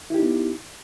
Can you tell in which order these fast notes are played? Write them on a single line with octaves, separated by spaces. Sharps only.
E4 G4 D#4 B3